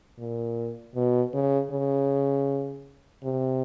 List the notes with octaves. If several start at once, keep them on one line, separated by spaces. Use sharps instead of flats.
A#2
B2
C#3
C#3
C3